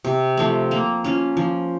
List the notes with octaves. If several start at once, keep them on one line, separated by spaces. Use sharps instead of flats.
C3
F3 A3 C4
A#3
C#4 F4
F3